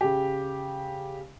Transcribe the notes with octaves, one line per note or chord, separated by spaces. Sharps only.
C#3 G4